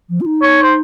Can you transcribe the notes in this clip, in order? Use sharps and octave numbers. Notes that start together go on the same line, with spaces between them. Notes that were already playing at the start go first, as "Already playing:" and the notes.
F3
F4
D#4
C#5
C5